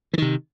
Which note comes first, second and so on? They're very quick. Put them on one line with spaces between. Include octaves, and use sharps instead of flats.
E3 D#3 C3